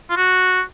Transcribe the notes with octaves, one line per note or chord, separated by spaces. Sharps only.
F4
F#4